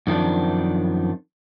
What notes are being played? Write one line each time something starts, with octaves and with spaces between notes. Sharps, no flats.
F#2 D#3 F3 C4 D4